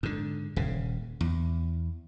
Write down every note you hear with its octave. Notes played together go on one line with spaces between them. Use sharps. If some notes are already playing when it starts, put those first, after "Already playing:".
G#2 D3
D#1 C#3
E2